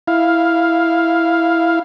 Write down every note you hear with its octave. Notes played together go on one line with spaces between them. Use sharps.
E4 F5